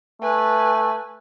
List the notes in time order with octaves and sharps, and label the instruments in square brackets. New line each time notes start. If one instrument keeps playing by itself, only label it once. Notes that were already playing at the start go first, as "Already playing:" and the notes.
[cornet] A3 [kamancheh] B4 G#5